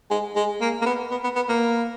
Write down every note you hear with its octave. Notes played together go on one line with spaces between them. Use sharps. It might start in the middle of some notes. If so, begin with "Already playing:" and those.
G#3
G#3
A#3
A#3
B3
B3
B3
B3
A#3